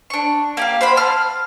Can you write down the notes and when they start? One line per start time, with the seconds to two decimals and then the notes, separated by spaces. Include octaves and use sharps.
0.10 D4 C#6
0.57 A#3 G4 F5
0.81 C5 F#5 B5 C6
0.96 A5 F6